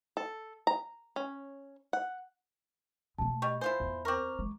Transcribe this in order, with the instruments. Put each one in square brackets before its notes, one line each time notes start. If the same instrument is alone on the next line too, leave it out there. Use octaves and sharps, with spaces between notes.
[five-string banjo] A4
A#5
C#4
F#5
[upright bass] B2 A3 [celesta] A5
[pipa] G3 [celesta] D#5 C#6
[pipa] E4 F4 C5 [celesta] G#5 C6
[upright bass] E2
[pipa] C4 A#4 [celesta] A#5 C#6 D6
[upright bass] G#3